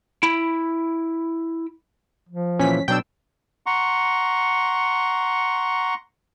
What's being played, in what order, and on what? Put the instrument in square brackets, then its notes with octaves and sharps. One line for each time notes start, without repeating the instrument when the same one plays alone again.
[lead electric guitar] E4 B5
[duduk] F3
[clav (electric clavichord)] A#2 E3 [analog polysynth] C#4 B6
[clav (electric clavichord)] B2 D4 [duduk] F#3 [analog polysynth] G5 E6
[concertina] F#5 A#5 C6 C#6